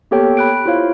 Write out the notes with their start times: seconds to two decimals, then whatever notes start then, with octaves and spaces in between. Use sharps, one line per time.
0.11 A#3 B3 G4 A4 C#5 G5
0.37 B5 F#6 D7
0.66 E4 F4 C5 C#5 F5